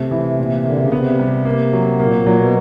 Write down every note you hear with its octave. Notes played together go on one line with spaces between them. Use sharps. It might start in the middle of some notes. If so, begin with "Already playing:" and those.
Already playing: C3 A3
E3
A#2
D3 A#3
C#3
C3 B3
G3
A#3
F#3
A#2 A#3
A#2
F#3
B2